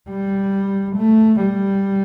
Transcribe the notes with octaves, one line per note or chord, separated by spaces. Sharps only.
G3
A3
G3